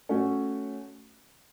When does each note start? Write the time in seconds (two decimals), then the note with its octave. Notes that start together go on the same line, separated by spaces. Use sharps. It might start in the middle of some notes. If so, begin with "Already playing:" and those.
0.09 A3 C#4 F#4